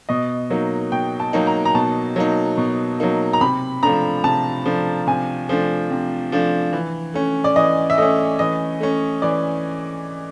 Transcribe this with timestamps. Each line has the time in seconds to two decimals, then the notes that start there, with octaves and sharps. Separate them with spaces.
0.09 B2 D#5
0.50 F#3 A#3 D#4
0.92 B2 G5
1.20 A5
1.33 F#3 A#3 D#4
1.47 A#5
1.65 A#5
1.75 B2 A5
2.16 F#3 A#3 D#4
2.57 B2
3.00 F#3 A#3 D#4
3.33 A#5
3.41 C3 B5
3.83 F3 A3 D4 A#5
4.24 C3 A5
4.65 F3 A3 D4
5.07 C3 G#5
5.49 F3 A3 D4
5.91 C3
6.32 F3 A3 D4
6.73 E3
7.14 A3 C#4
7.44 D5
7.56 E3 D#5
7.90 E5
7.98 A3 C#4 D#5
8.39 E3 D#5
8.80 A3 C#4
9.22 E3 D5